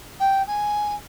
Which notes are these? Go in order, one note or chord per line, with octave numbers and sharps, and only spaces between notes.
G5
G#5